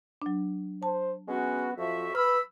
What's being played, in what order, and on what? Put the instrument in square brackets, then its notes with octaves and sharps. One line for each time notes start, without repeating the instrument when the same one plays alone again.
[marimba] F#3 D4
[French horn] C5 [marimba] A5
[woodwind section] G#3 C#4 F#4 [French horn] B3
[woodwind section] F2 F#4 E5 [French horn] F3
[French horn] B4 [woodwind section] B5 E6 [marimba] F6